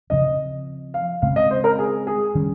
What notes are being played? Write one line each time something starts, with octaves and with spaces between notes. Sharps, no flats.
C#3 F3 C4 D#5
F5
C#3 G#3 C4 F5
D#5
C5
A#4
G#4
G#4
D#3 G3 C#4